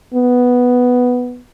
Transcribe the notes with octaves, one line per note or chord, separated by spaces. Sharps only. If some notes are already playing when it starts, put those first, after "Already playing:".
B3